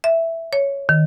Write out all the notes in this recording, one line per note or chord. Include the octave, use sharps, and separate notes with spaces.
E5
C#5
D#3